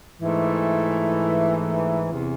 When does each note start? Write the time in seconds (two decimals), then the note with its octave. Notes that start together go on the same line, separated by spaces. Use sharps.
0.19 G#2 E3 A3
2.11 E2 C3 E3